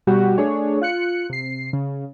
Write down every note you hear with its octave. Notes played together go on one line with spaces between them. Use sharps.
B2 G3 F#4 G4
A3 D4 G#4 C#5
F4 F#6 C#7
C3 C7
C#3